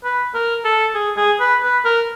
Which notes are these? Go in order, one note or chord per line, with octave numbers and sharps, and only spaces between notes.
B4
A#4
A4
G#4
G#4
B4
B4
A#4